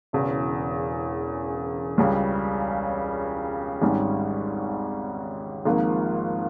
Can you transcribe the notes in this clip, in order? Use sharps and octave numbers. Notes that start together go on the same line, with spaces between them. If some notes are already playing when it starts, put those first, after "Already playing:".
E1 E2 C#3 E3
C#2 C#3 G3
G#1 G#2 G3 C#4
G#1 G#2 F3 A#3 F4